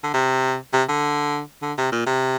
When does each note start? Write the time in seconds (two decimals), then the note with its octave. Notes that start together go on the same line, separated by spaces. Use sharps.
0.04 D3
0.14 C3
0.73 C3
0.88 D3
1.62 D3
1.78 C3
1.92 A#2
2.06 C3